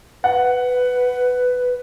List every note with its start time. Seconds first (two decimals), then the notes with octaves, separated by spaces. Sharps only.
0.24 B4 F#5